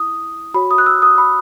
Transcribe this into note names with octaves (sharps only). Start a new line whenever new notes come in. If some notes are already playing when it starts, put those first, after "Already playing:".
Already playing: E4 D#6
F#4 C#5 B5
D#6
F#6
E6
D#6
B5